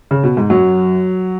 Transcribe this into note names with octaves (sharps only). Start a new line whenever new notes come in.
C#3
B2
G#2
F#2 F#3